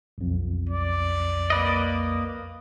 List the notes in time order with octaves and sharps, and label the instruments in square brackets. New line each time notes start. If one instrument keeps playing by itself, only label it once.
[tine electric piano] B1 F2
[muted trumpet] D5
[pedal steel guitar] A#3 B4 D#5